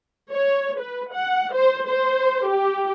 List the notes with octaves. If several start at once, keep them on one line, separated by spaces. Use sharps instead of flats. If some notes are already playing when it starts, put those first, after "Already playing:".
C#5
B4
F#5
C5
C5
G4